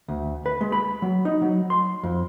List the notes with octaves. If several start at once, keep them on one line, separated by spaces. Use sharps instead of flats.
D2
B4
G#3
B5
F#3
D#4
F#3
C6
F2